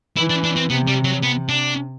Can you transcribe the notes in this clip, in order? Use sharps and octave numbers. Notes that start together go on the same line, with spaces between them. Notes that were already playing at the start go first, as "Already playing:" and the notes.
E3 E4
D4
D4
C4
C3 B3
G3
F#3
C3 B3
D4